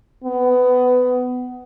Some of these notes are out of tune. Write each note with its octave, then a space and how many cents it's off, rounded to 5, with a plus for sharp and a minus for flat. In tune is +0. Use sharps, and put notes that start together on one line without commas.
B3 +20